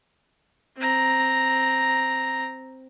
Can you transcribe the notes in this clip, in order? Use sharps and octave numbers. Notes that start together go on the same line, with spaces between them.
C4 A#5